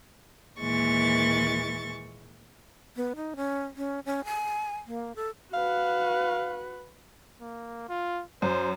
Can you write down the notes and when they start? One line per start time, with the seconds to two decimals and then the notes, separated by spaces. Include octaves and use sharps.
0.59 D#2 A#2 E3 G#3 C#6 A6
2.96 B3
3.16 D#4
3.36 C#4
3.76 C#4
4.06 C#4
4.25 G#5
4.86 A#3
5.16 A4
5.54 F#4 B4 F5
7.41 A#3
7.89 F4
8.42 F#2 C5